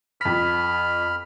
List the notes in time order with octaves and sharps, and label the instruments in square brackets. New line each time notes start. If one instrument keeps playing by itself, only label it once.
[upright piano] F2 B6 [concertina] B5 F6